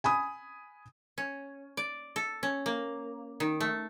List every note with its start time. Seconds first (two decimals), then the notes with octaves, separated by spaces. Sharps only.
0.04 G#5 B5 D#6
1.18 C#4
1.77 D5
2.16 A4
2.43 C#4
2.66 A#3
3.40 D#3
3.60 A3